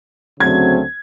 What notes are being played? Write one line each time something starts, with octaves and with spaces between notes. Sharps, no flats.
D2 C#3 F#3 A3 C4 G#6